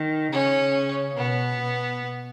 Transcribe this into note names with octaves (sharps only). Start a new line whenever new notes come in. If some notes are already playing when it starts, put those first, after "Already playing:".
Already playing: D#3
C#3 C#4
B2 B3
B2